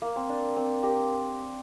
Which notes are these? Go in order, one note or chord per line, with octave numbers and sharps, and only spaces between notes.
A#3
C4
D4
C4
G4 A#4